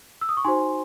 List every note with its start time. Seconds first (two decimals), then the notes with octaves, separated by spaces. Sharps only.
0.21 E6
0.29 D#6
0.37 C#6
0.44 D#4 F#4 C5 G#5 C6